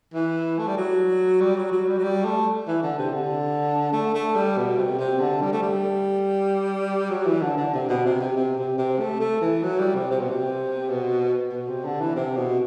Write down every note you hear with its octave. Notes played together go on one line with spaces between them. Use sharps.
E3
A3
G3
F#3
G3
F#3
F#3
G3
F#3
G3
A3
E3
D3
C3
D3
A3
A3
G3
B2
C3
C3
D3
G3
A3
G3
F#3
E3
D3
D3
C3
B2
C3
C3
C3
C3
C3
A3
A3
E3
F#3
G3
C3
C3
B2
C3
B2
B2
C3
D3
E3
C3
B2